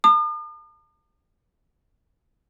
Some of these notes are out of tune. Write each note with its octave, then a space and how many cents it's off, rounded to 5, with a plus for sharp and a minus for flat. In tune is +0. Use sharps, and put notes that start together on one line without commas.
A5 +45 D#6 -45